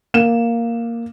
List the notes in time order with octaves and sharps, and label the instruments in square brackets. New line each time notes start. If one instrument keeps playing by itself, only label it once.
[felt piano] A#3 E7